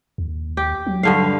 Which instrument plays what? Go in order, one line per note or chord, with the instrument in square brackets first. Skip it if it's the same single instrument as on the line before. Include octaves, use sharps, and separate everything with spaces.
[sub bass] D#2
[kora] G4
[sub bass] F#3
[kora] G2 D3 F5